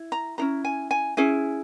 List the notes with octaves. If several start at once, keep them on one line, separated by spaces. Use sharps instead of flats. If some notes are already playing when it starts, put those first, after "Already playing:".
Already playing: E4
A#5
C#4 E4 G#4 A#5
G#5
G#5
C#4 E4 G#4 G#5